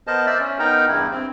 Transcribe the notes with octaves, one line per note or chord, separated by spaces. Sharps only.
B3 A#4 C5 D#5 A5
C5 D5 E5
C#4
B3 D#4 A#4 G5 A#5
E2 G2 E4
C4